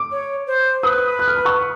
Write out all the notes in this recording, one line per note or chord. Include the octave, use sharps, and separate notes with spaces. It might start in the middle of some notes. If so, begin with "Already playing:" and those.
Already playing: D6
C#5
C5
B4 D#6
F#6
F6
B5
C#6